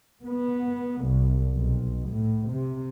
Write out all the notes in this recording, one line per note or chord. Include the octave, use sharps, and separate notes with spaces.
B3
C2
B1
A2
C3